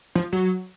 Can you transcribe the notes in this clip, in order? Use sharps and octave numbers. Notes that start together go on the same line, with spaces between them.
F3
F#3